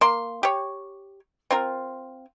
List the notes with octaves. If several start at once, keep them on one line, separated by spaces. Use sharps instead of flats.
A#3 C6
G4 C#5
C4 F4 A#4